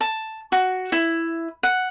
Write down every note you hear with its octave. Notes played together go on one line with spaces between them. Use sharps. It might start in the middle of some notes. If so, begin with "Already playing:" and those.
A5
F#4
E4
F#5